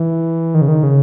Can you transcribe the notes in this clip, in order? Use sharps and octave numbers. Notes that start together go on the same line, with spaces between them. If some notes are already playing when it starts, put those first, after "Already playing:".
Already playing: E3
D#3
C#3
D#3
C#3